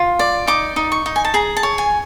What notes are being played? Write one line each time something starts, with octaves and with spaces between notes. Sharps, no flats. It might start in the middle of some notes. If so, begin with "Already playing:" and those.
Already playing: F4
D5
D#4 D6
D#4
C#6
D#4
G#5
A5
G#4 A#5
A5
C#5
G#5